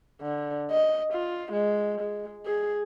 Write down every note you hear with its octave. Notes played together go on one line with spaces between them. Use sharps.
D3
D#5
F4
G#3
G#3
G#4